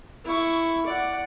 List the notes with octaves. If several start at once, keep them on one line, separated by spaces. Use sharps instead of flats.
E4 C#6
D5 F#5